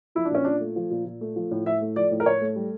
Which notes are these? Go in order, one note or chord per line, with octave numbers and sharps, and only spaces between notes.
F3 E4
D4
A#2 C#4
A#2 D4
A3
F3
A#2
A#2
A3
F3
A2
A2 E5
A3
F3 D5
A2
A#4
A2 C#5
A3
G3